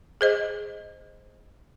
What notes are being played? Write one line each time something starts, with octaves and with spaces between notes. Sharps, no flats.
G#4 C5 D#5